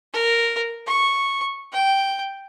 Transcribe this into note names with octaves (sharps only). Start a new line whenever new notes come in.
A#4
C#6
G5